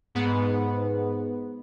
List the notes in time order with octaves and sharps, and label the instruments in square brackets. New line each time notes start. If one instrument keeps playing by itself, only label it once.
[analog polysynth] G#2 B3